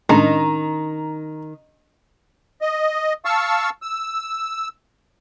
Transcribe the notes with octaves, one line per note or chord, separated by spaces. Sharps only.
A2 D#3 G#3 C#4 D4 A#5
D#5
F5 A5 C#6 E6
E6